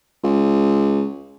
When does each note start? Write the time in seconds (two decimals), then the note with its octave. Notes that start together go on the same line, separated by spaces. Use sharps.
0.23 C#2